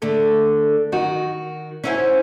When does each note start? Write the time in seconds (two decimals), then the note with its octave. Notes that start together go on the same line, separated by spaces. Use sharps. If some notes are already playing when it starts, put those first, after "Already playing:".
0.02 D3 A3 A4
0.92 D#3 D#4 F#4
1.84 C#4 D#4 E4 C5 F#5 G#5